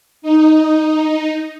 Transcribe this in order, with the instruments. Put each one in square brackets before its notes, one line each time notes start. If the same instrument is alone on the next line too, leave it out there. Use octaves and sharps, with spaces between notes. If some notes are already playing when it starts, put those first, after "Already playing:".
[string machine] D#4